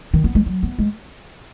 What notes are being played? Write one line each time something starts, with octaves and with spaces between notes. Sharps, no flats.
D#3
B3
G#3
F#3
B3
G#3